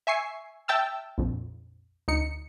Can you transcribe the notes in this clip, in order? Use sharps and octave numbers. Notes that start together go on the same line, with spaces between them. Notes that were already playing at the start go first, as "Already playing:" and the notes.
E5 G#5 C#6 C7
E5 G5 A5 E6 F6
A#1 F2
D2 D#4 C#7